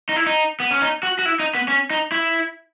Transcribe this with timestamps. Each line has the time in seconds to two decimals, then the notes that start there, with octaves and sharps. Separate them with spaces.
0.09 D#4
0.16 E4
0.26 D#4
0.60 B3
0.71 C#4
0.81 D#4
1.03 F#4
1.19 F#4
1.25 E4
1.40 D#4
1.55 B3
1.68 C#4
1.90 D#4
2.12 E4